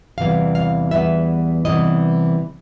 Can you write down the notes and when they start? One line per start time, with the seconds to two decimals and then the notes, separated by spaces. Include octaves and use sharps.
0.18 E2 C3 E3 G3 B3 F5
0.55 F5
0.91 E2 C3 E3 G3 B3 E5
1.65 C3 E3 G3 B3 D#5